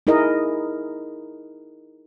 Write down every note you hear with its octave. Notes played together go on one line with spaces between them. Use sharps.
D#4 E4 G#4 A#4 D#5